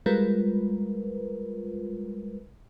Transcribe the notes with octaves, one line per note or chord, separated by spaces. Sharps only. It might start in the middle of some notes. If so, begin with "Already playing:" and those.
G3 G#3 F4 A#4 B4